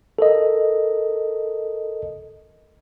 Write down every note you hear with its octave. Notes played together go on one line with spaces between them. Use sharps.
A4 A#4 D#5